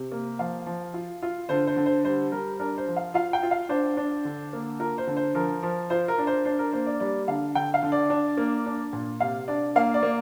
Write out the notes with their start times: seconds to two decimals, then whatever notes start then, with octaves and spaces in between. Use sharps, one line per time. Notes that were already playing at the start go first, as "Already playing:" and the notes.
Already playing: C3
0.12 A#3
0.39 F3 F5
0.66 F3
0.94 F4
1.22 F4
1.49 D3 C5
1.67 C5
1.76 D3
1.86 C5
2.05 G3 C5
2.32 G3 A#4
2.60 D4 A#4
2.78 C5
2.87 F3
2.96 F5
3.14 F4 F5
3.33 G5
3.43 F4
3.51 F5
3.69 D4 C5
3.97 D4
4.25 D3
4.53 A#3
4.80 F4 A#4
4.98 C5
5.07 D3
5.17 C5
5.34 F3 A#4
5.63 F3
5.90 F4 C5
6.08 A#4
6.18 D4
6.27 C5
6.45 D4 C5
6.59 A#4
6.72 A#3 C5
6.86 D5
7.00 G3 D5
7.28 D3 F5
7.55 D3 G5
7.74 F5
7.83 D3
7.92 D5
8.10 D4
8.37 A#3
8.66 D4
8.93 A#2
9.20 C3 F5
9.48 D4 D5
9.76 A#3 F5
9.94 D5
10.03 A#3